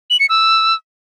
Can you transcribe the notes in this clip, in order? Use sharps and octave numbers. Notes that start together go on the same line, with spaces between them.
F#7
C#7
E6